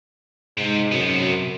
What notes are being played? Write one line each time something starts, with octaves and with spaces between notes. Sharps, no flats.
G#2 C3
F#2 C3 B3